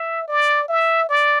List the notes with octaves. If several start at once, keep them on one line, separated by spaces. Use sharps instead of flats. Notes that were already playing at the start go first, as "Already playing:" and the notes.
Already playing: E5
D5
E5
D5